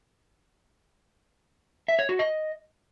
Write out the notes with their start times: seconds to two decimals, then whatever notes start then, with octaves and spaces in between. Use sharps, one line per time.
1.88 E5
1.99 C#5
2.09 F#4
2.19 D#5